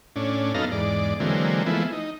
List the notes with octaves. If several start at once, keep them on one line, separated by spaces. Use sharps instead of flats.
A2 C#4 D4
F#2 B3 D#4 A4 F5 A#5
E2 G#2 D5
D3 E3 F#3 G#3 A#3 C4
E3 F3 G#3 A3 B3 E4
D#4